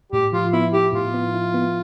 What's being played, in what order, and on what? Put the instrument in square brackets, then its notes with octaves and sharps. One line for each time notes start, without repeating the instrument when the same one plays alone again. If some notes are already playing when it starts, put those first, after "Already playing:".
[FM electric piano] A2 [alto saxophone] G4
[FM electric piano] F3 [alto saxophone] F4
[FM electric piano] B3 [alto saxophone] E4
[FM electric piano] E4 [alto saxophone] G4
[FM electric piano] A2 [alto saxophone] F4
[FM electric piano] B3
E4
B3